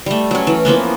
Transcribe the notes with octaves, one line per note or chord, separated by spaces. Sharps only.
G3 A3
F#3 C#4
E3
E3 F3 A#3 B3